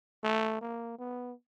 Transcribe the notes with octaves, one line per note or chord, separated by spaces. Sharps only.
A3
A#3
B3